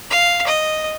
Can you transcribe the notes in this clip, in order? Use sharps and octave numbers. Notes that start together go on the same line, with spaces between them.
F5
D#5